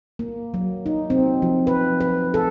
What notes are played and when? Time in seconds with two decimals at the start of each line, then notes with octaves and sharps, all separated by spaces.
0.19 A#3
0.54 F#3
0.86 D#4
1.10 C4
1.42 F3
1.67 B4
2.00 B4
2.34 A4